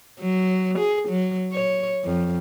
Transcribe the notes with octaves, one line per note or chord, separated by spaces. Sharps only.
F#3
G#4
F#3
C#5
F2